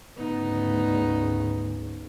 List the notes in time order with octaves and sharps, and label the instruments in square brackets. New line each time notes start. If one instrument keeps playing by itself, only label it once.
[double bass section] D2 G#2 C#3 [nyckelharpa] B3 D#4